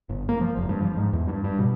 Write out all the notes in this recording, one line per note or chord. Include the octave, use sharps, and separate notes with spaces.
G1
A#3
F3
F1
G2
F3
G#2
E2
G2
G2
B2